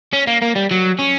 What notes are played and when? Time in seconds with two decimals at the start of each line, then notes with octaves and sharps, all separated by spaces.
0.13 C#4
0.28 A#3
0.42 A#3
0.56 G3
0.71 F#3
0.99 C#4